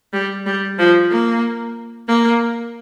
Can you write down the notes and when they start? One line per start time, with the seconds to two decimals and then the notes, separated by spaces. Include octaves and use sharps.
0.13 G3
0.46 G3
0.78 F3
1.11 A#3
2.08 A#3